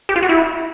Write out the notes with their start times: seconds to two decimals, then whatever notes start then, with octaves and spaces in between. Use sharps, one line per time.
0.09 G4
0.16 F4
0.22 F#4
0.29 E4